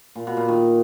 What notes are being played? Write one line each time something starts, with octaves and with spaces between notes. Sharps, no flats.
A#2
B2
A#2
D#3